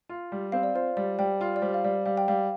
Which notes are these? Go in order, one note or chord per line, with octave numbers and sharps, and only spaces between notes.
F4
G3
C4 F5
D5
F4 C5
G3 D5
G3 G5
F4
D5
G3 C5
F5
G3 D5
G3 F5
G5
G3 F5